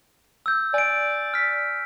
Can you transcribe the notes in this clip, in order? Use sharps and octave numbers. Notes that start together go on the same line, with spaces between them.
E6 G6
D5 G#5 D7
F6 B6